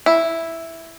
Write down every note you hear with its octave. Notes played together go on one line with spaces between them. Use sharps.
E4